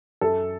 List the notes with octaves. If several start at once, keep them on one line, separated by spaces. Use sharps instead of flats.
F#2 A4